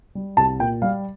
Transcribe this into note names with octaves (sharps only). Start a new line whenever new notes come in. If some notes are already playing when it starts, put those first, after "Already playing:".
G3
C2 A5
A#2 G5
G3 F5